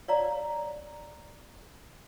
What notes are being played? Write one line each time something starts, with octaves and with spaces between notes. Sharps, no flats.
C#5 D5 F5 A#5